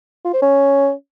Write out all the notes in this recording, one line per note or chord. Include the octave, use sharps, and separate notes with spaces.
F4
C5
C#4